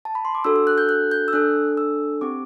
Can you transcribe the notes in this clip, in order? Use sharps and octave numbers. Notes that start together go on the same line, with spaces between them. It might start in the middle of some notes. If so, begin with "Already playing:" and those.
A5
B5
C6
D6
D4 F#4 A4 E6
E6
F#6
G6
F#6
G6
E6
D4 A4 F#6
E6
C4 G4 D6